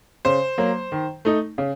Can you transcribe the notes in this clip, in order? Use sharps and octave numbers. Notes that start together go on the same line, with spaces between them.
C#3 C5
F#3 A#3
D#3
A3 D#4
C#3